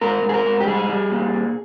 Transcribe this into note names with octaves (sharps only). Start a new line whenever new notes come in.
G#2 A#4
G#2
G#4
A#4
G#2
G4
G3 G#4
G3
A#2
A#2